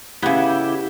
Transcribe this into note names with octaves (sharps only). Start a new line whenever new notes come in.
C#3 B3 E4 G4